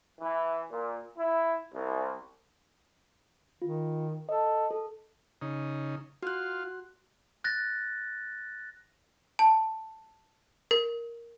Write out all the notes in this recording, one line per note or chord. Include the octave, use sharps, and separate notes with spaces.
E3
A#2
E4
C2
D#3 F4
A4 D#5
A4
C#3 D#4
F4 F#4 F#6
F#6 A6 A#6
A5
A#4